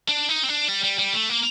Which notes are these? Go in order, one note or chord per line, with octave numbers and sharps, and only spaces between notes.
D4
D#4
C4
D4
G3
G3
G3
A3
A#3